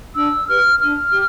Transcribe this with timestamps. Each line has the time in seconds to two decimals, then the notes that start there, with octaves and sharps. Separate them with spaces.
0.17 D4 E6
0.48 G4 B4 F6
0.80 D4 F6
1.12 G4